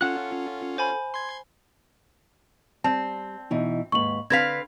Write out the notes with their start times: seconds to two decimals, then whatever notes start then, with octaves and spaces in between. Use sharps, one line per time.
0.01 C#4 F4 A4 F#5 F#6
0.78 C5 G#5 B5
1.14 C6 G#6
2.84 G3 C4 A5
3.51 B2 E3 D#4
3.92 D#2 G#2 B4 C#6 F#7
4.30 D3 C4 B4 F5 G#6 B6